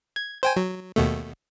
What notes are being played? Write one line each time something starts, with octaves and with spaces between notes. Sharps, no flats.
G#6
C5 G5 G#5
F#3
D#2 B2 A3